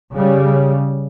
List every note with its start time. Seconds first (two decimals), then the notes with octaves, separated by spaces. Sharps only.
0.11 C#3 G3